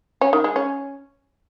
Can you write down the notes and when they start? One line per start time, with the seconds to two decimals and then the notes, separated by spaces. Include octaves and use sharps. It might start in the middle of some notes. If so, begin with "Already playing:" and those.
0.21 C#4
0.33 D#3
0.44 G#3
0.56 C#4